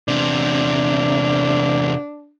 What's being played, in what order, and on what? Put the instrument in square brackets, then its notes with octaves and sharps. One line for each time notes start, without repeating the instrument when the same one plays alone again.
[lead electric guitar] E2 C3 [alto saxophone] D4